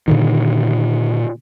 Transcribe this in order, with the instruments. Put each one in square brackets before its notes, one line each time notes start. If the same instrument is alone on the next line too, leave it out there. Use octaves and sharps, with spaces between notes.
[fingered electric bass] A#2 D3 D#3